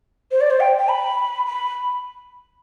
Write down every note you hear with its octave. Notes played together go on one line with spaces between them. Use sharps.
C5
D5
C5
G5
G5
B5
B5